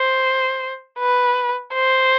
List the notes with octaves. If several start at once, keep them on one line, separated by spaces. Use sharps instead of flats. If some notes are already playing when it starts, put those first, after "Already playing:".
Already playing: C5
B4
C5